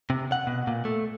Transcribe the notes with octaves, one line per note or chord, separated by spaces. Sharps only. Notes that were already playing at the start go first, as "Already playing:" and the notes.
C3
F#5
B2
A#2
A3